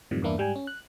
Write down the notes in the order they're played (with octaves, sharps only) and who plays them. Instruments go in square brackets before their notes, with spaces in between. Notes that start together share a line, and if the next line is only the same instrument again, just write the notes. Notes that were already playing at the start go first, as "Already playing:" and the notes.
[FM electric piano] F#2 A2 C3 D#3 F3 G3
E2 G2 E3 A#3 D4 E4
G#2 G3 G5 G#5
C#4
F#6